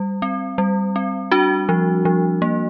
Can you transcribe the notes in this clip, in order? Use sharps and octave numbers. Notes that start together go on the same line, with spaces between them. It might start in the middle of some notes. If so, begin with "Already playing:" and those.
Already playing: G3
C4
G3
C4
D4 F#4
F3
F3
A#3